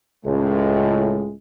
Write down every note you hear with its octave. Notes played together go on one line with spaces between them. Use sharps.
C#2 A2 G#3